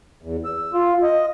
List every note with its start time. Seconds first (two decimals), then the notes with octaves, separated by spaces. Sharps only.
0.22 E2
0.45 E6
0.74 F4
1.03 D#5